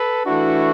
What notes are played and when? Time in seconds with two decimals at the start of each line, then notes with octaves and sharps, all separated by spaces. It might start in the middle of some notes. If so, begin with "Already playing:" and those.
Already playing: A4 B4
0.26 E3 A3 D4 E4 F#4